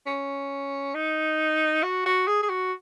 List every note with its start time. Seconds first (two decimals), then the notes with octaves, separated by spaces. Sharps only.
0.06 C#4
0.94 D#4
1.83 F#4
2.06 F#4
2.27 G#4
2.43 G#4
2.49 F#4